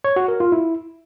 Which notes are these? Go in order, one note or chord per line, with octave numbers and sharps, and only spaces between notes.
C#5
F#4
A#4
F4
E4